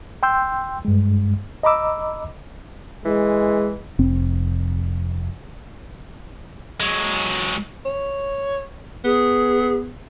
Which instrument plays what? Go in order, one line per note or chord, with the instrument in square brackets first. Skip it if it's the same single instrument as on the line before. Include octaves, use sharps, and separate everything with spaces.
[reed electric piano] G5 C6 E6 G6
G2 G#3
D#5 A#5 B5 D6 E6
[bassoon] E3 [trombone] G#3
[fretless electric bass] F1 C4
[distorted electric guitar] F#3 G#3
[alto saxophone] C#5
[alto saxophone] B3 [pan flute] G#4